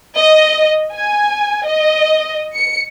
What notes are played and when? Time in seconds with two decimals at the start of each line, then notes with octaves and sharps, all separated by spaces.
0.17 D#5
0.94 G#5
1.65 D#5
2.56 C#7